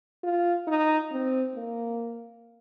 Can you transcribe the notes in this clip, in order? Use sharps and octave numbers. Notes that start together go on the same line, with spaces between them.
F4
D#4
C4
A#3